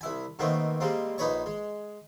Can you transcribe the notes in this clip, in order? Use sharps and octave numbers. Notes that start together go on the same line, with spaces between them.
C2 E4 G#5
B2 D#3 A3 A#3 C4
G3 G#3 A#3 C4
A#1 D#4 B4 C#5 C#6
G#3